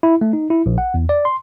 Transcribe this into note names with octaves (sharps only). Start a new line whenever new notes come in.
E4
A3
D#4
E4
A#1
F#5
E2
D5
C6